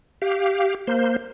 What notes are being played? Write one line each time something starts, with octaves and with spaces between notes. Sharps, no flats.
G4 F5
A#3 C5